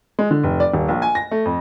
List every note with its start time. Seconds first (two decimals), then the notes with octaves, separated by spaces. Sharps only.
0.19 G#3
0.31 D3
0.44 F1
0.60 D5
0.74 D#1
0.88 A#1
1.02 G#5
1.15 A#6
1.31 A3
1.45 F2